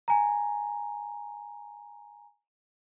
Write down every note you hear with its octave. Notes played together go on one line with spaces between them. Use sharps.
G#5 A#5